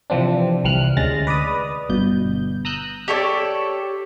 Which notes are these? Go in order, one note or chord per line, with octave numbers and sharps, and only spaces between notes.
C3 E3 F3 C4 D4
C2 E3 G3 F6 F#6
D2 C#3 G#3 A6 A#6
B4 D5 B5 D#6
G1 B2 G6
A#5 D#6 E6 F#6 G6
G4 A4 C#5 D5